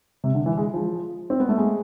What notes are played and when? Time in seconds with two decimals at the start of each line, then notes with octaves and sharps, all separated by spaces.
0.24 C3
0.35 D3
0.46 E3
0.58 G#3
0.74 F3
1.30 C4
1.40 B3
1.49 A3
1.58 G#3